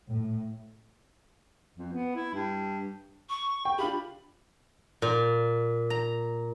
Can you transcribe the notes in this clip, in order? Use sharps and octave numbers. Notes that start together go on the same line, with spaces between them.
A2
F2
B3
E4
G2
C#6
G5
D4 F4 G4 B5
A#2
A#5